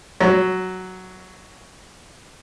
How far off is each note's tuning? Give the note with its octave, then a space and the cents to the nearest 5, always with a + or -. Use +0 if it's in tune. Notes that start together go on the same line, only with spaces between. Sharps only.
F#3 +5